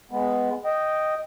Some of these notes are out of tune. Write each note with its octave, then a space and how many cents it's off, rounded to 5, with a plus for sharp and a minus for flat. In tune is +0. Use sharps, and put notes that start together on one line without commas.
G#3 +0 B3 +10
D#5 +0 G5 -10